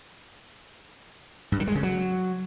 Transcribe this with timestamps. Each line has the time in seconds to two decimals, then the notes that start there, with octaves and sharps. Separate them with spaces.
1.52 G2
1.60 D#3
1.67 G#3
1.75 C#3
1.83 F#3